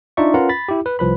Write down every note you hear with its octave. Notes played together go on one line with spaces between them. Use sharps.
D4 D#4 F4 D5 E5 C#6
C#4 F4 A#4 B4 F#5 A#5
B5 A6 B6
E4 G4
B4
C2 F3 B4 B5